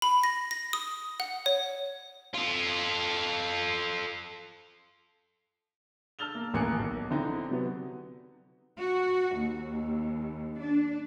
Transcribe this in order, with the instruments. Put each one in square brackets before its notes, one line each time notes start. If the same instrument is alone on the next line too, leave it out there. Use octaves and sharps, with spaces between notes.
[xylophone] B5
A#6
A#6
D#6
F#5
C#5
[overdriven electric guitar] F4 A4
[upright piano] A5 E6 F6 A6 F7 G7
A#3
D#1 A1 A#3 G#5 F#6 C#7
B1
D3 C4 D#4 E4
C3 F#3 B3
[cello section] F#4
D#2
D4